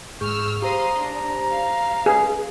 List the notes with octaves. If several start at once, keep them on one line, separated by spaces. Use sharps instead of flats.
G#2 G#4 C#6 E6 F6 G6
G4 C5 F5 A#5 C6 D#6
D4
F5
G#4 B4 G#5